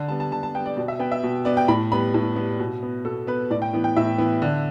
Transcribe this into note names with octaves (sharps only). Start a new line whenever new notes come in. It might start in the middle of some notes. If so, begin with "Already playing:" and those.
Already playing: D3
G3 B3 A5
A5
D3 A5
A5
G3 B3 G5
D5
B2 D5
E5
B3 G5
E5
B2
B3 D5
G5
A2 B5
G3 B3 B5
A2
G3 B3
B2
B3
B2 A4
B3 B4
A2 D5
G5
E3 B3
G5
A2 E5
E3 B3
D3